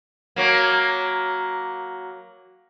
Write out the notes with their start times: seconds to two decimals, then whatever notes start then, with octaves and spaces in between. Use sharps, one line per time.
0.36 F#3 A#3